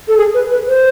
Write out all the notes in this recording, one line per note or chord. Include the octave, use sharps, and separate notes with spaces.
A4
G#4
B4
B4
C5